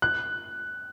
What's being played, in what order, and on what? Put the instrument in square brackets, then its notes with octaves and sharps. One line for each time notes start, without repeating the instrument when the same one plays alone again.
[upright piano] F#6